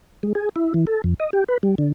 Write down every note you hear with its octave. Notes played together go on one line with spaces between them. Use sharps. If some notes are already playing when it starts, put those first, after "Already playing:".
G#3
G#4
E4
E3
A4
F2
D#5
G4
B4
G3
D3